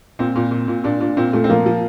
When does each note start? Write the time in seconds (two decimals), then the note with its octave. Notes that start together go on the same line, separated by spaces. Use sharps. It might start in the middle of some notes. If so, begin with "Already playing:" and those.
0.19 A#2 C4
0.35 A#2
0.51 A#2
0.68 A#2
0.84 A#2 D4
1.00 A#2 D4
1.17 A#2 C4
1.33 A#2 A3
1.44 C4
1.49 F3 A#3
1.66 F3